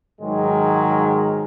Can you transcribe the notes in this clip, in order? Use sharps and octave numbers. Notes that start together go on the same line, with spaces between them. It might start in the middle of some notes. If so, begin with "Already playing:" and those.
G#2 D#3 F#3 G#3